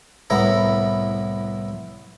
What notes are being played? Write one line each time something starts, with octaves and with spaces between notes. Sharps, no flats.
C2 A2 B3 E4 A#5